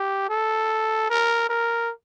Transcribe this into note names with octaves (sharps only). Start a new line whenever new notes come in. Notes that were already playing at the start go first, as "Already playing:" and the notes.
Already playing: G4
A4
A#4
A#4